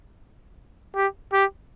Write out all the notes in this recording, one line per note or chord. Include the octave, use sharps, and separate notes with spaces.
G4
G4